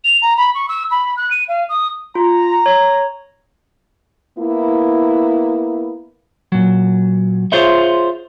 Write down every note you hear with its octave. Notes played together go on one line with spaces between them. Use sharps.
F7
A#5
B5
C#6
E6
B5
F#6
D#7
F5
D#6
F4 A#5
C#5
A#3 B3 E4
A#2 F#3
F4 G#4 C5 C#5 E5